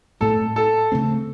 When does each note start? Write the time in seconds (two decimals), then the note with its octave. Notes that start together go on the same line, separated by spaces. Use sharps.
0.20 A2 A3 C4 A4
0.56 A4
0.92 C#3 A3 C4